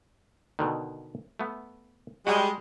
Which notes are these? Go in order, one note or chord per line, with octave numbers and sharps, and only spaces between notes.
B2 D3 D#3
A3 B3
G3 G#3 F#4